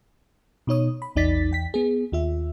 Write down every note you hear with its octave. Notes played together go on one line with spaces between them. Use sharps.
B2 D#4 C#5 D#6
B5
A#1 E2 D#4 D5 A6 B6
E2 G5 B6
B3 G#4
D#2 F4 E5